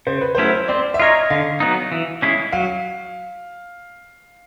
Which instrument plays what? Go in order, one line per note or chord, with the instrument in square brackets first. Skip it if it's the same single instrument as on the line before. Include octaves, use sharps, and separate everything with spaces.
[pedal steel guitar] C#3 [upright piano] C5
[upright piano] B4
[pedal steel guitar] F#3 A3 C#4 E4 [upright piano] C5
[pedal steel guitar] C4 [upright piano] D5
[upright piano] E5
[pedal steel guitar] F4 A#4 C#5 [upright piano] D#5
[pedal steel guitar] D3 [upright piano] F5
[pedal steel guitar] F#3 B3 D#4
E3
G#3 C#4 E4 G#4
[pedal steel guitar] F#3 [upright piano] F5